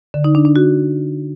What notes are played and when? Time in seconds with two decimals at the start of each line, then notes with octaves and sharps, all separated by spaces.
0.14 D3
0.24 D#4
0.35 D4
0.45 D4
0.56 F#4